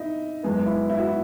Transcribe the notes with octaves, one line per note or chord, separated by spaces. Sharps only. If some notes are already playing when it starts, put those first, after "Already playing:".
Already playing: D#4 E4
F#2 E3 G#3 B3
E4
E4
F#4
E4